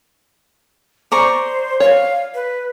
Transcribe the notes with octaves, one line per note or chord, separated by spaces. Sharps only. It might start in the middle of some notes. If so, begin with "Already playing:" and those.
C5 D5 A#5 C#6
C#5 F5
B4